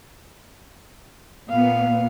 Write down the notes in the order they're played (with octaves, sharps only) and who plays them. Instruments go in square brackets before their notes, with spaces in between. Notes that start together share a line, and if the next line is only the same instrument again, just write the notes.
[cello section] A#2 B3 [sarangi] F5